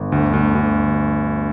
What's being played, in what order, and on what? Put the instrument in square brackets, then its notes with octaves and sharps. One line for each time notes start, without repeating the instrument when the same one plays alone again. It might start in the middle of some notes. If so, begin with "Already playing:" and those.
Already playing: [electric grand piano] G1
D2
D2
D2